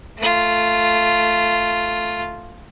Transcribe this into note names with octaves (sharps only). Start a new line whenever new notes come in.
A3 F4